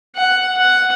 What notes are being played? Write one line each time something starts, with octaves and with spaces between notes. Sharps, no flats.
F#5
F#5